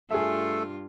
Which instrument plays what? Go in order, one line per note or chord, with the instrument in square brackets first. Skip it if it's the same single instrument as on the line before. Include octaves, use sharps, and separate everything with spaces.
[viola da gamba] G2 F4 [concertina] A3 A4 [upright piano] G#4 E5